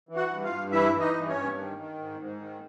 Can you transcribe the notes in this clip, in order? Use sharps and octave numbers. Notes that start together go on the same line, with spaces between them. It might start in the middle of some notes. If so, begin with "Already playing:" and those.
E3
F#4 F#5
G2
F4 F5
G2
E3 E4 E5
E3
D#4 D#5
G2
C#4 C#5
G2
D#3
D#3
G#2
G#2
D#3